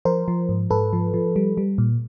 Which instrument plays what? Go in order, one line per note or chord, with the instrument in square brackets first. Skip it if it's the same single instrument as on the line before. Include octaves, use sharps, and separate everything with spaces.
[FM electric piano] F3 A#4 C5
F3
G#2
G#2 A4 B4
F3
F3
G3
G3
A#2